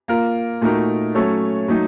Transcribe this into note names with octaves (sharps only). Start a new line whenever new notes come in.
A#3 F4 A#4
A#2 A3 D#4 F#4 A#4
F#3 A3 C#4 A4 C#5
F#3 A3 D#4